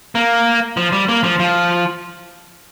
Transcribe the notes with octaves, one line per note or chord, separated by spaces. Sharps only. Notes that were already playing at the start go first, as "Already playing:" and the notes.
A#3
F3
G3
A#3
F3
F3